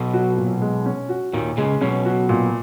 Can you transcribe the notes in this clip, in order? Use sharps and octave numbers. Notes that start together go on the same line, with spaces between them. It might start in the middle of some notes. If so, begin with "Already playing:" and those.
Already playing: B1 B2
F#4
A#2
G#3
C#4
F#4
D#2 A#2 D#3
C#2 C#3 G#3
B1 B2 C#4
F#4
A#2